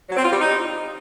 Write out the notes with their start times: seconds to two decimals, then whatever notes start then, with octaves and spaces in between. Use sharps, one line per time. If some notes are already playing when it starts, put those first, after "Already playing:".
0.09 F#3
0.17 C4
0.25 F4
0.32 G3
0.40 D#4